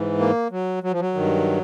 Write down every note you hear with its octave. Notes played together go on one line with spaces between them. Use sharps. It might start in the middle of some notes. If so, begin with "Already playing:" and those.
Already playing: G#2 E3
A#3
F#3
F#3
F3
F#3
G2 D#3